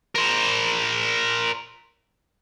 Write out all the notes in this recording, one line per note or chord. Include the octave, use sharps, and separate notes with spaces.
A#4 C5